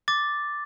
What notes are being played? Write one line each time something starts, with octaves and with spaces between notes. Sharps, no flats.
D6 A6